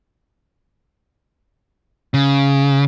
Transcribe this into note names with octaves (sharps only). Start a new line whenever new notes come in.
C#3